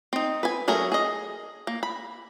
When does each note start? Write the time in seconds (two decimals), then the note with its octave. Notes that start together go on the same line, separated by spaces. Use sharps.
0.13 C4 D#4
0.43 B4 G#5
0.68 F#3 A3 C#4 G#4 A#4
0.92 G#4 D#5
1.67 A#3
1.83 B5